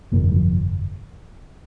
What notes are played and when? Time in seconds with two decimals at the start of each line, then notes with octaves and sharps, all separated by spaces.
0.12 G1 F2 C3 A#3
0.31 G3
0.36 F3